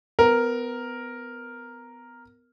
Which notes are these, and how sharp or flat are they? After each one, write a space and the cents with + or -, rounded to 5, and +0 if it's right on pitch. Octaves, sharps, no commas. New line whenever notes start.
B3 +25 A#4 +0